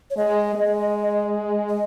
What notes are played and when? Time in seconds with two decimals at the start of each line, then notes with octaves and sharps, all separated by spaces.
0.10 C#5
0.17 G#3 D#5
0.55 G#3
1.69 D#5